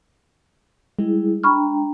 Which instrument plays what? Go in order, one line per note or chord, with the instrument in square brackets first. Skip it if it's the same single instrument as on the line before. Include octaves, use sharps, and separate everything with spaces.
[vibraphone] G3 E4 G#4 [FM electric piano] G#3
[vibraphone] D4 G5 A#5 [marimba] B5 C#6 F6